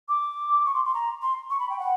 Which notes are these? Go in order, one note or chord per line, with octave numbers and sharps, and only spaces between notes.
D6
C#6
C6
C6
A#5
C6
C#6
B5
G5
F#5